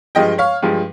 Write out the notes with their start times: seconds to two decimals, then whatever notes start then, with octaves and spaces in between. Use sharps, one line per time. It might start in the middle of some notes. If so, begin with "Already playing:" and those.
0.15 G2 F3 G#3 D#5 G5
0.38 C#5 F5
0.62 G2 F3 G#3